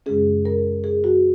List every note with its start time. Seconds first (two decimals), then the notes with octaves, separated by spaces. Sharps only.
0.06 F#2 C#3 G#3 C#4 G#4
0.45 A#4
0.84 G#4
1.04 F#4